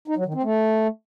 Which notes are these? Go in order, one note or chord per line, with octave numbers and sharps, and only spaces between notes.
D#4
F#3
D#3
C4
A3